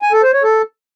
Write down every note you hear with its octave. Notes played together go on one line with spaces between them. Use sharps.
G#5
A4
C5
C#5
A4